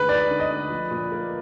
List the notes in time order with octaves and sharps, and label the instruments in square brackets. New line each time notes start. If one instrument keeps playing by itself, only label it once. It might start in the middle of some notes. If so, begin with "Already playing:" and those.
Already playing: [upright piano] D2 D3 G#3 [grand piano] B4
[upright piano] D#4 [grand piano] D5
[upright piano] D3
[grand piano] D#5
[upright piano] D2
F3
A#2
A#3